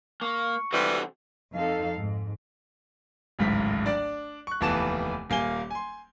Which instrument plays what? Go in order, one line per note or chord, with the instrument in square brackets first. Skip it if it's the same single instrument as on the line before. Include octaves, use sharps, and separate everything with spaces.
[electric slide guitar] A#3 [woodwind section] C#6
[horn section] C3 E3 G3 [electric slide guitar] C4 F#4 A4
[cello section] F2 D#4 A4 F5
G#2
[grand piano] D1 G#1 C#2 G#2 B6
D4 D5
C#6 F#6
F1 D#2 E3 B3 A5 E7
D#1 A#3 G#5 G7
G#5 C6